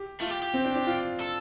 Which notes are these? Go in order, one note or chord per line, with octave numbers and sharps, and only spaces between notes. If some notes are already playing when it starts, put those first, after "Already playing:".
Already playing: G4
A3 F4
G4
G4
C4
D4
D4
F4
A4